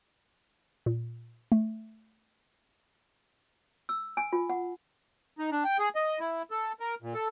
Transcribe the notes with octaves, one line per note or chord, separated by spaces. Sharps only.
A#2
A3
E6
G#5
F4
F#5
D#4
D4
G5
G#4
D#5
E4
A4
A#4
A#2
A4